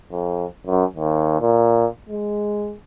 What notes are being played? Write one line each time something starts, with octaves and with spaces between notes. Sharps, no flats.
F2
F#2
D#2
A#2
G#3